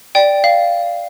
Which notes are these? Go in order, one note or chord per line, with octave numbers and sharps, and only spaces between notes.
D5 G5
F5